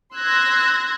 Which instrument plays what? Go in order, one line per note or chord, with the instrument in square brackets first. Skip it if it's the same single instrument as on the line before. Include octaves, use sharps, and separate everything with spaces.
[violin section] C6 E6 F#6 G#6 A#6